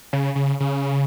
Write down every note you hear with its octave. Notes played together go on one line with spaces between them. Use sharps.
C#3
C#3
C#3